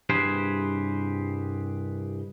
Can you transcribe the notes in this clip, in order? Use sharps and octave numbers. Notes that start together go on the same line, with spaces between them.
C2 G2 G4 G#4 B4 C5